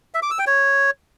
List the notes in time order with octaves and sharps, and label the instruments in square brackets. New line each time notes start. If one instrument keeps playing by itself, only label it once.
[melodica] E5
D6
E6
G5
C#5